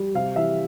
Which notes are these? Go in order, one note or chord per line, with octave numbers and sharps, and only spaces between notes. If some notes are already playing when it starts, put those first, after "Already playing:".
Already playing: G3
C3 F5
E3 E5